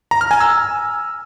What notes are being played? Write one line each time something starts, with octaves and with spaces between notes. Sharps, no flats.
A#5
F6
G#5
E6